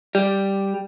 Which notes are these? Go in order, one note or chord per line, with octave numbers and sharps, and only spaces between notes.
G3